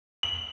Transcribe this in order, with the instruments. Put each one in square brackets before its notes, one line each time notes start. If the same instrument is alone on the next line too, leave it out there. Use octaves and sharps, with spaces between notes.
[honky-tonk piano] F#7